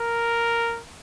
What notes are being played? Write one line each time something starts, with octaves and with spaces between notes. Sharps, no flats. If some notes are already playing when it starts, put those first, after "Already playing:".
Already playing: A#4